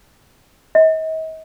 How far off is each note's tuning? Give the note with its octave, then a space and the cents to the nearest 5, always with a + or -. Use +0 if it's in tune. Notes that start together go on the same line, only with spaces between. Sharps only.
D#5 +40